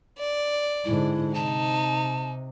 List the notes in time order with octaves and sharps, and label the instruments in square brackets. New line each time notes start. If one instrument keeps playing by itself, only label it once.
[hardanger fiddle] D5
[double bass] G#2 D3 [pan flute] E4
[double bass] C3 [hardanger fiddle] D#4 [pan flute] A5